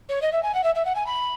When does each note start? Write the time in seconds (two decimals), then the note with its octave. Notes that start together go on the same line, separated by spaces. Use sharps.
0.09 C#5
0.22 D#5
0.32 E5
0.43 G#5
0.54 F#5
0.64 E5
0.75 E5
0.85 F#5
0.95 G#5
1.06 B5